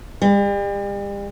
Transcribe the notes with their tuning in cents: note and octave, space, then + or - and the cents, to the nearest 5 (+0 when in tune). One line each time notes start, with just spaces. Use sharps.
G3 +40